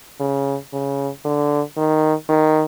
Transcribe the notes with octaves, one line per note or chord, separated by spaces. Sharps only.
C#3
C#3
D3
D#3
D#3